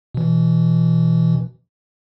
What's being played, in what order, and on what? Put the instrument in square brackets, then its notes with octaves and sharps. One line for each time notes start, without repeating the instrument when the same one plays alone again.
[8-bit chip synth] B2 E3